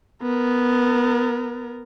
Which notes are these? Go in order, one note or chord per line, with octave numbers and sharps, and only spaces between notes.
B3 A#4